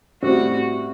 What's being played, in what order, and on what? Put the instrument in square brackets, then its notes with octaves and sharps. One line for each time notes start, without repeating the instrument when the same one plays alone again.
[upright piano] A2 G3 C4 [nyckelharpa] F#4